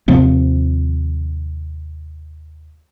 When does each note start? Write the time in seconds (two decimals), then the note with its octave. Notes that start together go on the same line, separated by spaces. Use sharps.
0.08 D#2 C3 F3 C4